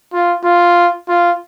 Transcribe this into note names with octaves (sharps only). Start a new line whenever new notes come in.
F4
F4
F4